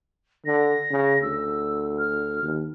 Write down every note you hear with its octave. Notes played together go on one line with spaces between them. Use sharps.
D3 A#6
C#3
D2 E6
F6
D#2